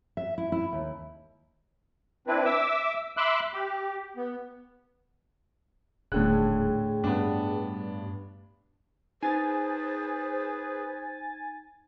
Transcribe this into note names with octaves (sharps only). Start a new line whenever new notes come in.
E5
E4
E4
D#2
C4 D4 E4 B4
E5 D6 E6
E5 B5 C6 D6 E6 F#6
G4
B3
D#1 A2 D3 G#4 A4 G5 F#6
G2 B3 D4
D#4 G#4 B4 C5 G#5 A6